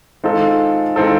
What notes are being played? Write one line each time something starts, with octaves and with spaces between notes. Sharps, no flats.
D#3 G#3 C4 F4 A4
D#3 G#3 C4 F4 A4